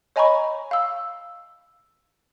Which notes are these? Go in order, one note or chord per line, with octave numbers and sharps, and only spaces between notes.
C#5 D#5 G#5 A#5 B5 C#6
F5 E6